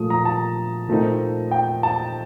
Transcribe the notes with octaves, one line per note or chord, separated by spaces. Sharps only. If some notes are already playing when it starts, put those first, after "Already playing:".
Already playing: A#2 F3 A3 D#6
A#5
A5
A#2 A3 C4 D#4
G5
A5